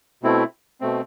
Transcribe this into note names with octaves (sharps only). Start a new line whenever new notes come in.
B2 A3 C4 E4
B2 A3 C4